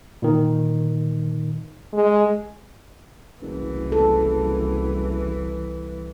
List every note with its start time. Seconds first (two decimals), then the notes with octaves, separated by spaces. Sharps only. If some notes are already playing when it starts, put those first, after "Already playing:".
0.22 A#2 D#3
1.94 G#3
3.42 F#1 C2 E3
3.92 A4